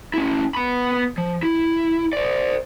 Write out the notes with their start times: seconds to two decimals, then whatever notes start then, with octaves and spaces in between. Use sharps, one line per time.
0.14 C#4 E4
0.55 B3 B5
1.18 F3
1.43 E4
2.13 C5 D5